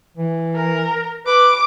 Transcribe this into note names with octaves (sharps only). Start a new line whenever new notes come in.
E3
A#4
B4 D6